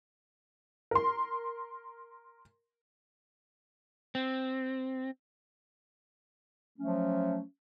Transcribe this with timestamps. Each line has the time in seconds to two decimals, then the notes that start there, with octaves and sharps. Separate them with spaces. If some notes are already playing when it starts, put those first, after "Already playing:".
0.91 A#4 C6
4.15 C4
6.79 F3 F#3 A3 C#4